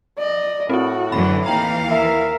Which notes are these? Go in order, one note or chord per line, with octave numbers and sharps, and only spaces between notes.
D5 D#5
A2 C4 E4 F#4
F#2 D3 E3 B5
D#2 E3 D#4 F5 G5 A#5
E4 A#4 E5